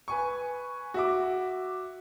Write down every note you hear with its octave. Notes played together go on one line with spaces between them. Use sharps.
B4 G#5 C#6
F#4 E5 D6